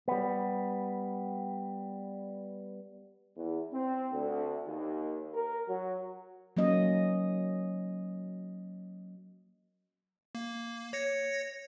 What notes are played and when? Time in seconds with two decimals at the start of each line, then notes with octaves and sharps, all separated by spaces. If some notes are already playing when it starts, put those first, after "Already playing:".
0.08 G3 B3
3.37 E2
3.73 C4
4.12 D2
4.67 D#2
5.34 A#4
5.68 F#3
6.57 F#3 A#3 C#4 D#5
10.35 A#3
10.93 C#5 A#6 C#7